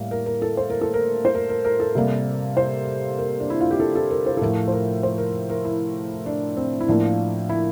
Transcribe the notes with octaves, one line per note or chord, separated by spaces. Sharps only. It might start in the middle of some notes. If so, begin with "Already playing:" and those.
Already playing: A2 G3 A#3
A#4
A#4
A4
C5
A#4
A4
A#4
C5
A#4
A#4
A#4
A4
C3 G3 A#3
C5
A#4
D4
E4
F4
G4
A4
A4
A#4
C5
A4
A2 F3 A3 A#4
C5
A#4
C5
A#4
A#4
E4
D4
C4
E4
A2 F3 A#3 D4
E4